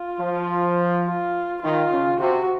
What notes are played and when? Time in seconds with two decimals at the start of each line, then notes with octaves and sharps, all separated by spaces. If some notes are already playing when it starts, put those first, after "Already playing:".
Already playing: F4
0.20 F3
1.05 F4
1.62 D#3 F4
1.91 C#3
2.20 C3 F#4